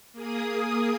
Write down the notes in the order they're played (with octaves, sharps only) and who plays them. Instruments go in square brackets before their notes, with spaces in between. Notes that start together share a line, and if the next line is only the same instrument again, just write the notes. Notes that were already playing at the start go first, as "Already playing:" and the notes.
[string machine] A#3 G#4 D#6